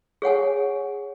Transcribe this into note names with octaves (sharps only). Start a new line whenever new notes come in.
G#4 C#5 F#5 G#5